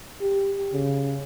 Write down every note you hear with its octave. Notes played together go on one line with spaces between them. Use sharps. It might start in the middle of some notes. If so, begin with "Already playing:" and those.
G4
C#3